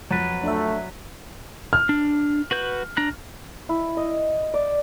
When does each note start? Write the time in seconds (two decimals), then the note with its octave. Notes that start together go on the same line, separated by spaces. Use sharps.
0.11 F2 F#3 B4 A6
0.43 A3 D4 E5
1.73 F6
1.89 D4
2.51 F#4 B4 G6
2.97 D4 A#5 F#6
3.69 E4
3.97 D#5
4.54 D5